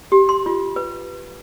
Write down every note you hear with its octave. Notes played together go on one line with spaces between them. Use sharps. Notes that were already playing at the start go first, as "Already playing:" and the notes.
G4
C6
F4
B4